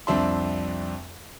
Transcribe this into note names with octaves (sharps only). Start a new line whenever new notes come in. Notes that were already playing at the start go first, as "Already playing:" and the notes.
C2 F2 C4 D4 E5 C6